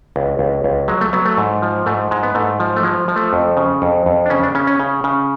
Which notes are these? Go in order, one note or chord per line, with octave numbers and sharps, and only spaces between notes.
C#2
C#2
C#2
F#3 G#3
A3
F#3 B3
A3
G#2
F3
G#2 A3
G#2 G#3
B3
G#2 A3
F3
A3
F3 G#3
F3
A3
F2
C#3
F2
F2
D4
C#3 C#4
D4
C#3 C#4
C#4
C#3
C#3